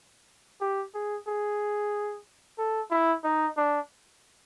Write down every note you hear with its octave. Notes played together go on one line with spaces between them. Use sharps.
G4
G#4
G#4
A4
E4
D#4
D4